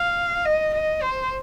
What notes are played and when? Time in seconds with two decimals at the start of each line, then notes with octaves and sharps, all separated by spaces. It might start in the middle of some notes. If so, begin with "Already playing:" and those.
Already playing: F5
0.45 D#5
0.74 D#5
1.02 C5